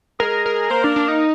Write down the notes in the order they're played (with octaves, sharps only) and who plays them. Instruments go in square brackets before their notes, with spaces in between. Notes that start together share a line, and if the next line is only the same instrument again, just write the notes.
[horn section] G#3 G#4 [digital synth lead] A#4
[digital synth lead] A#4
[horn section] A#3 A#4 [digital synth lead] C5
[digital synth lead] D4
D4
D#4